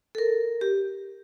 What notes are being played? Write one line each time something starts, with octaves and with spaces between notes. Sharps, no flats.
A4
A#4
G4